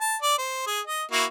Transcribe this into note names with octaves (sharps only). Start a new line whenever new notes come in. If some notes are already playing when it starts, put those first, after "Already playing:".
A5
D5
C5
G#4
D#5
A#3 E4 F#4